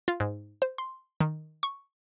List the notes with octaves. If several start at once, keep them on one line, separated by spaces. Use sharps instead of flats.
F4
G#2
C5
C6
D#3
C#6